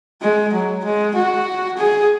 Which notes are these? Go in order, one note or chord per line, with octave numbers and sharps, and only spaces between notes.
G#3
F#3
G#3
F#4
G#4